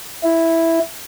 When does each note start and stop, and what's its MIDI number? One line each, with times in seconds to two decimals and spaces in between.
0.24 0.79 64